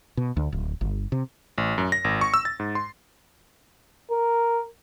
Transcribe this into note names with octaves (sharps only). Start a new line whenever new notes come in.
B2
D2
D1
G1
C3
A1
F#2
A#6
G#1
C#6
E6
A6
G#2
C6
A#4